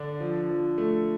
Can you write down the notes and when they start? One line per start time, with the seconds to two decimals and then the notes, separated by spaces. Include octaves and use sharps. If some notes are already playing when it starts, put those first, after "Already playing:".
Already playing: D3 D4
0.20 F3
0.50 F3
0.78 A3